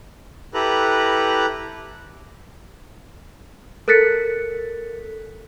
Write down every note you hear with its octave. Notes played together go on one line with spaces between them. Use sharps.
E4 G4 A4 B4 A#5 F#6
A4 A#4 F#6 A6 B6 C#7